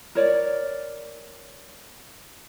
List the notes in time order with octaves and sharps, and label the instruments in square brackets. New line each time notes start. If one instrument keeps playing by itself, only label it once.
[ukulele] A#4 C#5 D5